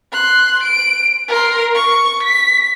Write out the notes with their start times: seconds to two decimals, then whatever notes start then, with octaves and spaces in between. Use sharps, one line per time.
0.12 C6 F#6
0.63 D7
1.28 A#4 C6
1.75 C#6
2.23 B6